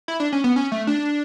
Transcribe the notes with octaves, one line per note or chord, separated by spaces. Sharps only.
E4
D4
C#4
B3
C#4
A3
D4